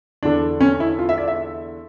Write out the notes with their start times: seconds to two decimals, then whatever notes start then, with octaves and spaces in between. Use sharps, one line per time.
0.23 E2 D3 D4
0.61 C#4
0.80 E4
0.99 F4
1.09 E5
1.18 D5
1.28 E5